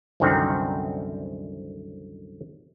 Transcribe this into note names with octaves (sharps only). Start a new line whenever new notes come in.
C2 F#2 D3 D#3 C4